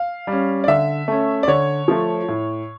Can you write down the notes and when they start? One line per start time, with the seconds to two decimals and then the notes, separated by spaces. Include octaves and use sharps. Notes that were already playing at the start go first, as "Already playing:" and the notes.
Already playing: F5
0.27 G3 C#4
0.64 D5
0.68 D3 E5
1.08 A3 C#4
1.43 D5
1.48 D3 C#5
1.88 F3 A3
2.28 A2